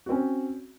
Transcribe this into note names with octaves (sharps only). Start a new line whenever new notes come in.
C4 C#4 F#4